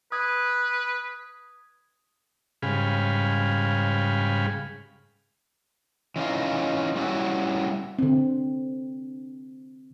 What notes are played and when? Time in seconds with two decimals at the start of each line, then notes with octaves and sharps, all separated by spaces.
0.12 B4 D#6 G#6
2.62 G#2 C#3 G3 G#4 F5 B5
6.16 E3 C#4 D#4 F4
6.96 G3 C#4 D#4 E4 F#4
7.99 D3 C4